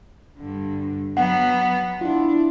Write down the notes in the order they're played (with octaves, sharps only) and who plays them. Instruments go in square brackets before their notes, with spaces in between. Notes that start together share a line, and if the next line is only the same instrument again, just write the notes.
[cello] G2 D3
[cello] F#3 B3 [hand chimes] F#5
[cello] D4 [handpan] E4 F4